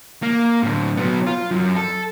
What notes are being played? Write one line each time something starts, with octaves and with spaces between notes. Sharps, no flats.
A#3
A2 D3
F#3 B3
F4
F#2
A4